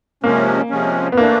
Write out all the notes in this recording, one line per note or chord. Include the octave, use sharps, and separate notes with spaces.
C3 F3 G#3 A#3 C#4
C3 F3 G#3 C#4
B3
E3 A3 A#3 D4